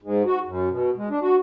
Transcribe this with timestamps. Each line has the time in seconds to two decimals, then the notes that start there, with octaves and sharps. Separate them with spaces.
0.02 G#2
0.26 F#4
0.47 F#2
0.71 B2
0.97 G#3
1.10 D4
1.22 F#4